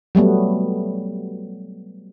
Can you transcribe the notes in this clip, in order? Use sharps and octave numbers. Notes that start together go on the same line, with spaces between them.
F#3 G3 A3 B3